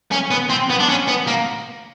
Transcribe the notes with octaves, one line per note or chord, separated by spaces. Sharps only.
C#4
B3
C4
B3
D4
C#4
B3
A#3